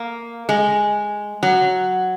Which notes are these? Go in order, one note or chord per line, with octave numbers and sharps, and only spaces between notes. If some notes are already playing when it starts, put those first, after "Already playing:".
Already playing: A#3
G#3
F#3